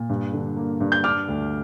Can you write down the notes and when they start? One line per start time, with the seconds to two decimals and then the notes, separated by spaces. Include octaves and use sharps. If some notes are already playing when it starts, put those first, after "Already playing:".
Already playing: A#2
0.09 G2
0.33 D3
0.56 A#3
0.80 G2
0.92 G6
1.04 D4 D6 F6
1.28 D2